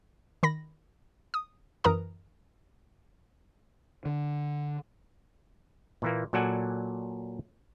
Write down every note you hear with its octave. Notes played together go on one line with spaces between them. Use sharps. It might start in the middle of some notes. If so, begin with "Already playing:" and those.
D#3 B5 A#6
D#6
F#2 E3 A#4 B4 A#5 D#6
D3
A#2 E3 A#3
A#2 F#3 A4 D5 F#5 G#5